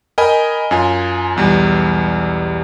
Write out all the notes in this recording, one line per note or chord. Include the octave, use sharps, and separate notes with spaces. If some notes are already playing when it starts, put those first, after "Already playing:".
A#4 D#5 G5 G#5 B5
F#2 F4 G#5
B1 E2 G3